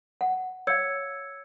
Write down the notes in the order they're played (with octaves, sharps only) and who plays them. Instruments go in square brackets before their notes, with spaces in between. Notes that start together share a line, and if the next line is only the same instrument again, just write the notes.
[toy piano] F#5
[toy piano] C#5 F5 [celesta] E6 G#6 C#7